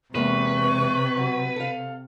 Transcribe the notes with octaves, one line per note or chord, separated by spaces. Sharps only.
E2 C3 G#3 A#3 B4 C#6
F#3
A4 F5